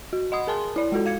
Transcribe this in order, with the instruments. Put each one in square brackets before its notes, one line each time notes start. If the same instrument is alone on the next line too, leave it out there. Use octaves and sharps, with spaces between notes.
[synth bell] F#4
D#5 F#5 B5 D#6
G#4 A#4 G#5 A5 C6
E4 D5
G#3 F#4 A4
F5 G#6 C#7